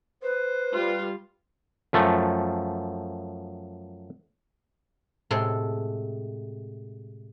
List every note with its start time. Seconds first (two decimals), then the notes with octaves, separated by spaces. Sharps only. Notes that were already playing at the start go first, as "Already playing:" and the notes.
0.23 B4 C5
0.72 G3 F4
1.93 F#2 F3 A3
5.31 A2 C3 G#3 A4 C6